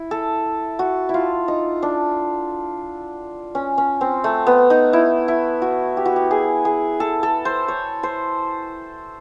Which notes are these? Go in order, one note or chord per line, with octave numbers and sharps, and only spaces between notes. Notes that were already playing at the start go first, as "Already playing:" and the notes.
Already playing: E4
A4
F#4
E4
F4
D#4
D4
C#4
C#4
C4
A3
B3
D#4
E4
E4
F#4
G4
F#4
G4
G#4
G#4
A4
A4
C5
C#5
C5